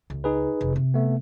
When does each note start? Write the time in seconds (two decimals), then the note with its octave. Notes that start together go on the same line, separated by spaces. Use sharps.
0.10 C#2
0.24 D#4 G#4 B4
0.61 F1
0.76 C3
0.94 A3 B3